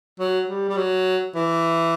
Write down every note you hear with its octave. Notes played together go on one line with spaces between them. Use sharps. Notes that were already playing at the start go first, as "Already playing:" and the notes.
F#3
G3
G3
F#3
E3